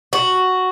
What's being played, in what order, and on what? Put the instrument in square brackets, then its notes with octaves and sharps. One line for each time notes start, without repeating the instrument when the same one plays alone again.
[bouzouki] F#4